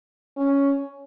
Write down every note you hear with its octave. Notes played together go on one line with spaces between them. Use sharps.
C#4